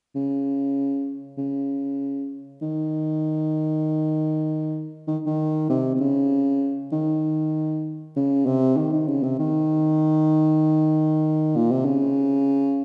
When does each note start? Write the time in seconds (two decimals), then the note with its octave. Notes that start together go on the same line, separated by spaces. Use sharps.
0.15 C#3
1.38 C#3
2.62 D#3
5.08 D#3
5.26 D#3
5.70 C3
5.95 C3
6.00 C#3
6.92 D#3
8.16 C#3
8.46 C3
8.77 D#3
8.93 D#3
9.08 C#3
9.23 C3
9.39 D#3
11.56 A#2
11.71 C3
11.85 C#3